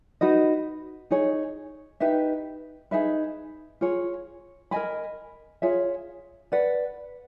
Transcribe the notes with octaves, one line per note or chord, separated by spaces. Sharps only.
D#4 F#4 B4 D#5
D#4 G#4 C#5
D#4 G4 B4 E5
D#4 G#4 B4 E5
F4 G#4 C#5
A#4 D#5 G#5 B5
F4 G#4 C#5 E5
B4 D5 F#5